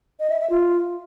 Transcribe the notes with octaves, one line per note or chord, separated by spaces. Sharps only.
D#5
E5
E5
F4